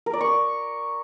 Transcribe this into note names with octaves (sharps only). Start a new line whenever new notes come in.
A#4
D5
C#6